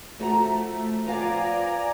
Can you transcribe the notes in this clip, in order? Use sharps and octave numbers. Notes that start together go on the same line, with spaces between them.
F3 A3 F#4 A#5
F3 B3 D5 F5 G#5 A#5